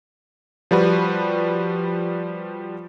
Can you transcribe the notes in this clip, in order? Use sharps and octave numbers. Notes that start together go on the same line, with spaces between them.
F3 G3 F#4 B4